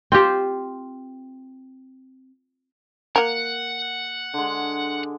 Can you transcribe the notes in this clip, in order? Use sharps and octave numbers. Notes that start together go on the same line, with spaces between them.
C4 F4 G4 C5
A#3 A#4 F#5
D3 G#3